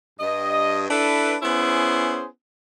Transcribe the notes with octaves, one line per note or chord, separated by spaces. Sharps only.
G2 D#5
D4 E4 A4 B4
B3 C#4 E4 G#4 C5